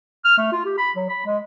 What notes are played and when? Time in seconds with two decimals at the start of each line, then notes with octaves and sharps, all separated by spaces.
0.25 F6
0.38 A3
0.52 F4
0.65 G4
0.78 B5
0.96 F#3
1.09 B5
1.26 G#3